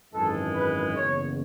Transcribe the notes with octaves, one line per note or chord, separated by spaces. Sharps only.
G#1 F#2 E3 G#3 A4
B4
F#1 E2 C#3 C#5